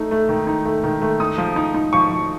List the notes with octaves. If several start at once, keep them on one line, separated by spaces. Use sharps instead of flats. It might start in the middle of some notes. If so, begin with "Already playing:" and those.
Already playing: A3 D#4
A3
D#3
D#4
A3
D#3
A3
D#4 D#6
F3
D#4
D#4
F3 C#6
F3